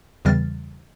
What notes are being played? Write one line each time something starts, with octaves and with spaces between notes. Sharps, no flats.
E2 C#3 E3 G3 F6 A6